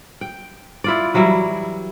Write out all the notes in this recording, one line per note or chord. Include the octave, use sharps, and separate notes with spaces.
G5
E4 F4 D5
E3 F#3 G3 E4